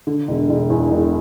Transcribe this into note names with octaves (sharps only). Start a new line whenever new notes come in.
D3
E1
E1
E2
E1